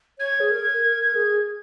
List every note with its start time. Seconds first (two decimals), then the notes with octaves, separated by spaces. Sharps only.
0.19 C#5 G#6
0.40 G#4
0.51 A#4
0.83 A#4
1.04 A#4
1.15 G#4